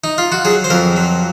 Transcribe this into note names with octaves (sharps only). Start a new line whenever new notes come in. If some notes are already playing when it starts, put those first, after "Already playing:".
D#4
F4
F#4
F#3 G#4
C5
F2 A#4
F#3